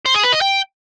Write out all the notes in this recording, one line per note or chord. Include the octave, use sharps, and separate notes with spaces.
C5
G#4
B4
D#5
G5